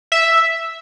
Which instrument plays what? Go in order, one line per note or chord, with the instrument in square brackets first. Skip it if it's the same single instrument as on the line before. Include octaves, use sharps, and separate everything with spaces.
[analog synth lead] E5